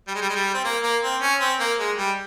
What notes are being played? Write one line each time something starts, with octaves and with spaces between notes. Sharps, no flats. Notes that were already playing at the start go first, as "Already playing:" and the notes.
G3
G#3
G3
G#3
G3
C4
A#3
A#3
C4
C#4
C4
A#3
G#3
G3